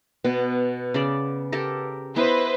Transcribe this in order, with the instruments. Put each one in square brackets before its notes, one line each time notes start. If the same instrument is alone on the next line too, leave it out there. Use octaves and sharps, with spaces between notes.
[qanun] B2 [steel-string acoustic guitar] B3
[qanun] C#3 D5
G4 A4 A#4
[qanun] B3 E4 D#5 [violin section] B4 C5